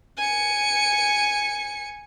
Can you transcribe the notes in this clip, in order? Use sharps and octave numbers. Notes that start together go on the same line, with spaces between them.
G#5 C#7